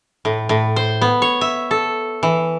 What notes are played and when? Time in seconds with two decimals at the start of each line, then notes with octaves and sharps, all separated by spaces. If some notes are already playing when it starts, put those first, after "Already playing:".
0.25 A2
0.49 A2
0.76 C5
1.01 B3
1.22 C#5
1.41 E5
1.71 A4
2.23 E3